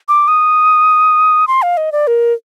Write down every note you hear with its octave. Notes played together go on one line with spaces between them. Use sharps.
D6
D#6
C6
F5
D#5
D5
A#4